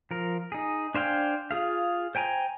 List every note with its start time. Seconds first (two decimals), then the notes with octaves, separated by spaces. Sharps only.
0.11 F3 A#4
0.52 D#4 G#4
0.95 D4 C5 F5 G5 G#5
1.51 F4 G#4 F5
2.15 C5 G5 G#5 A#5